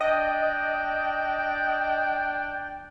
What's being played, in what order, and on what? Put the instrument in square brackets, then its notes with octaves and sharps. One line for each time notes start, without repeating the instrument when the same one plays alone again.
[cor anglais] D4 [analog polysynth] D#5 [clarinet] G5